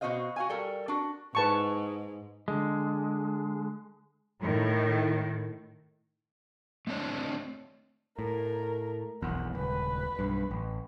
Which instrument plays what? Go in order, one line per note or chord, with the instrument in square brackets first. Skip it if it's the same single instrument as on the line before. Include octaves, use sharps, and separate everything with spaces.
[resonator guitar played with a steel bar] B2 D#4 F#4 C5 D#5 F5
F#4 F5 G#5
G3 A4 A#4
D4 F#4
[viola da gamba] G#2 [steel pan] B4 A5 C#6
[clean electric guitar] D3 G#3
[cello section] A2 D#3
[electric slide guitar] A3 C4 D4 C#5 D#5
[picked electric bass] A2 [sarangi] A#4
[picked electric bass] F1 B1 E2 [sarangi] F#5
[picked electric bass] D#1 C#2 [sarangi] B4
[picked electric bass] B1 G2
A1